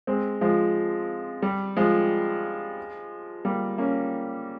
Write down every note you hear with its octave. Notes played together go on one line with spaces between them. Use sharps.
G#3 C4
F3 G#3
G3
F3 G#3
G3 A#3
A#3 C#4